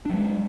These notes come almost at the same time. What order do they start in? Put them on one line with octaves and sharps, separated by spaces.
D4 F#3 G#3